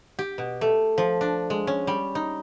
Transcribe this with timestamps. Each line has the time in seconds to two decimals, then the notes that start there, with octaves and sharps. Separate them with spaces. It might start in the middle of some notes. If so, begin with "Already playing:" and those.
0.19 G4
0.38 B2
0.61 A3
0.98 F3
1.21 D4
1.50 G#3
1.67 C#4
1.87 G3
2.15 D#4